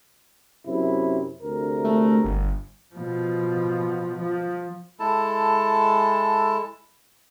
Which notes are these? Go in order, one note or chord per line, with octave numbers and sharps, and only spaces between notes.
F#2 C3 E4
D2 C3 A#4
A3
G1
B2 F3
F3
G#3 E4 A4 A5